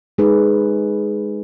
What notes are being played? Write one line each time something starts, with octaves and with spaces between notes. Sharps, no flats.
G#3 D#4 G#4 B4